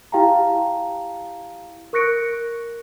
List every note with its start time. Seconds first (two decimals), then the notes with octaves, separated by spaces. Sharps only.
0.12 E4 G4 F5 G5 A5 A#5
1.93 A#4 C#6 F#6 A#6 C#7 D7